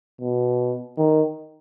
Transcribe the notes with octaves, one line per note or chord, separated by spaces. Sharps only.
B2
D#3